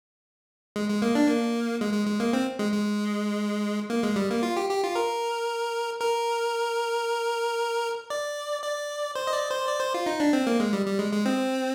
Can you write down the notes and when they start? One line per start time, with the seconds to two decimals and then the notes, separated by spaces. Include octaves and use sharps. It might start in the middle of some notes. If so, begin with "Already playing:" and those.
0.76 G#3
0.89 G#3
1.02 A#3
1.15 D4
1.28 A#3
1.81 G#3
1.94 G#3
2.07 G#3
2.20 A#3
2.33 C4
2.59 G#3
2.73 G#3
3.90 A#3
4.03 G#3
4.16 G3
4.30 A#3
4.43 F4
4.56 G4
4.69 G4
4.83 F4
4.95 A#4
6.00 A#4
8.10 D5
8.63 D5
9.16 C5
9.27 D#5
9.32 D5
9.50 C5
9.67 D5
9.81 C5
9.94 F4
10.06 D#4
10.20 D4
10.33 C4
10.47 A#3
10.60 G#3
10.73 G3
10.86 G3
10.98 G#3
11.12 G#3
11.26 C4